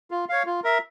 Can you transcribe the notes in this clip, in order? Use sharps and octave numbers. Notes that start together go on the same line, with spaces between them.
F4
C#5 F5
F4
A#4 E5